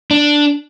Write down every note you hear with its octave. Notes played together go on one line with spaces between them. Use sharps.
D4